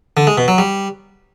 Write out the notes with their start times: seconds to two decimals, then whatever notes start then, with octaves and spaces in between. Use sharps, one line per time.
0.17 D3
0.27 G#3
0.38 B2
0.48 F#3
0.58 G3